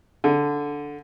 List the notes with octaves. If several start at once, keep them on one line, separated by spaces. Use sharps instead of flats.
D3